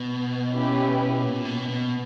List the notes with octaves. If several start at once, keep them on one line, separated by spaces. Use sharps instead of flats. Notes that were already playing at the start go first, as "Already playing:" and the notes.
Already playing: B2
C#4 E4 G4 B4
A#2
B2
B2